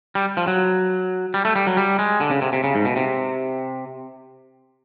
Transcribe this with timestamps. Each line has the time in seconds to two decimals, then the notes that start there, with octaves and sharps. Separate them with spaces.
0.15 G3
0.37 F3
0.47 F#3
1.34 G3
1.45 A3
1.56 G3
1.67 F#3
1.77 G3
1.99 G#3
2.20 D3
2.31 C#3
2.42 C3
2.53 C3
2.64 C#3
2.75 G#2
2.85 B2
2.96 C3